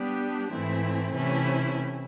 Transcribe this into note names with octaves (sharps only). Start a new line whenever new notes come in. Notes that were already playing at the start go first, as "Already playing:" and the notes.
Already playing: G3 B3 D4 G4
G#2 E3 A3 C4 E4
C3 E3 A3 C#4 E4